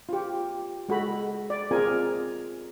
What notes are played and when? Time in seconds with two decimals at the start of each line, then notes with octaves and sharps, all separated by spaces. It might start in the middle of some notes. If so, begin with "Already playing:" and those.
0.09 F4 G4
0.89 G#3 F#4 A4 B5
1.50 D5
1.71 C4 F4 G#4 A#4 G#5